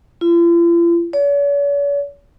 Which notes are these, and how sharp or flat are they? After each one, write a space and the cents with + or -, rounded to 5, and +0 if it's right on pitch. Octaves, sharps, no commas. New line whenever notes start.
F4 -45
C#5 +45